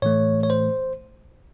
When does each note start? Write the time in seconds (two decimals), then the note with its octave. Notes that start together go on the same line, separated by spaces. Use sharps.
0.02 A2 E3 A3 C#5
0.43 C#5
0.50 C5